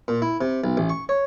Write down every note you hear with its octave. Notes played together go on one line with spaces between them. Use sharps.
A#2
E4
C3
B1
A1
C#6
C#5